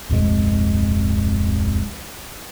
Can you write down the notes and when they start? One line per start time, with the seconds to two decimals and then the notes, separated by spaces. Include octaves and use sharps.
0.09 D1 B1 F2 G#3